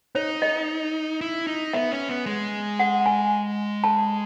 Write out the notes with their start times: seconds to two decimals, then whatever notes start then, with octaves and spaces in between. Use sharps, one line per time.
0.15 D#4 C#5
0.42 D#5
1.21 E4
1.47 D#4
1.73 B3 E5
1.91 C#4
2.09 B3
2.26 G#3
2.79 F#5
3.06 G#5
3.84 A5